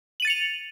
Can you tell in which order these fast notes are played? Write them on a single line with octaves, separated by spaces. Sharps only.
F#7 D#7 A6 C#7 F7